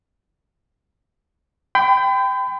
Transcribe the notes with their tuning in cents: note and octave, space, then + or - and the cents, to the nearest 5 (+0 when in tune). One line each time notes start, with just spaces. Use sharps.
G5 +0 B5 +40